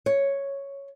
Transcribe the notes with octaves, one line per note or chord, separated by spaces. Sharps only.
C#5